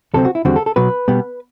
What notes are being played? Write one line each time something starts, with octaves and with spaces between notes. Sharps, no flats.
D2 C3 F#3 C4 A4
F#4
E4
E2 D3 G3 C4 F#4
A4
A4
B1 B2 F#3 B4
B2 G3 B3